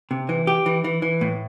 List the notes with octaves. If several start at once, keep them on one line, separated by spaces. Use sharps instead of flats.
C3
E3
G4
E3
E3
E3
A2